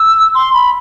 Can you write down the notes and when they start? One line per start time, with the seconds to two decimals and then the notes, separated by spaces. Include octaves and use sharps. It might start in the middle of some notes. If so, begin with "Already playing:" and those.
Already playing: E6
0.35 C6
0.54 B5